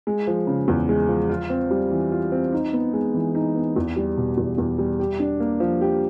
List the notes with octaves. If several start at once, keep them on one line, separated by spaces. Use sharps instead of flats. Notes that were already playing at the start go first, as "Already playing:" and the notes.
G#3
F3
C#3
E2
G#3
F3
F4
C4
G3
E3
F4
C4
D#4
B3
G#3
E3
D#4
B3
E2
G3
B2
E2
E2
G3
G4
D4
A#3
F3
G4